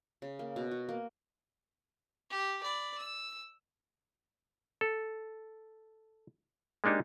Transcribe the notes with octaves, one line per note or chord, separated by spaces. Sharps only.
C#3
A#3
B2
F#4
A#3
G4
D5 B5
E6
A4
G#3 A#3 D4 D#4 G4